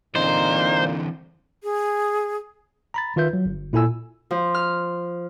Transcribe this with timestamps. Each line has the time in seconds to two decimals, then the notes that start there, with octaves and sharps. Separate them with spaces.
0.16 A#2 D3 E3 C4 D#4 C5
1.63 G#4
2.94 A#5 B5 A6
3.16 D#3 F4 B4 E5 G6
3.33 F#3
3.46 G1
3.73 A#2 E4 A4 G#5 E6
4.31 F3
4.54 F6